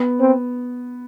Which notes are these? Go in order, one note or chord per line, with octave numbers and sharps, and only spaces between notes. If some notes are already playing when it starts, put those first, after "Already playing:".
Already playing: B3
C4